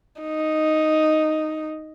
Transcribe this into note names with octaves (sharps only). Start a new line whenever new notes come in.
D#4